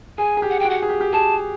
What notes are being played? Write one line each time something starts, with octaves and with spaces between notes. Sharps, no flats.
G#4 G#5
G#4
G4
F#5
G5
F#4
F#5
G#4
G4
G4
G#4 A5